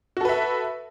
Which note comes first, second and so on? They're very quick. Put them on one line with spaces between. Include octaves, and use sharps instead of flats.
F#4 A4 B4 E5